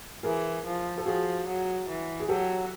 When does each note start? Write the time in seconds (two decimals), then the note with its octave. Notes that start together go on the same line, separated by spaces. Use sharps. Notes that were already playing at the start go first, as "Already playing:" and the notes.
0.23 E3 G#4 A#4
0.65 F3
0.98 A4
1.06 F3 F#4 G#4
1.48 F#3
1.89 E3
2.20 G#4
2.29 F#3 G4 A4